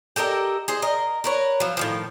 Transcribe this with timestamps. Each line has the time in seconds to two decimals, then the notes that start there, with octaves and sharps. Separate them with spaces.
0.16 G4 A4 A#4 D#5
0.68 G#4 C5 D#5
0.82 A#4 D#5
1.24 A#4 B4 C#5
1.60 F3 F#3
1.77 A2 D#3 F3